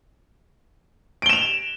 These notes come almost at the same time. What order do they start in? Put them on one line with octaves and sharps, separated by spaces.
D7 G7 E7 F7